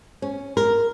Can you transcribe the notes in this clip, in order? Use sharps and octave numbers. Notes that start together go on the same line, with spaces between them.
C#4
A#4